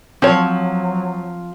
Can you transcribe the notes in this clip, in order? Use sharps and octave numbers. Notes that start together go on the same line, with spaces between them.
F3 F#3 C4 C#5